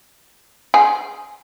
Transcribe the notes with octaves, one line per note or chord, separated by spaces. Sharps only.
G#4